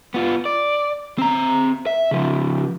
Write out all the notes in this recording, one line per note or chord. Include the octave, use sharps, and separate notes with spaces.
B3 F4
D5
C4 A#5
E5
C#3 F3